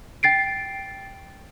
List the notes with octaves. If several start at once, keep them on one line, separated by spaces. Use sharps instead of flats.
G5 A6 C7 D7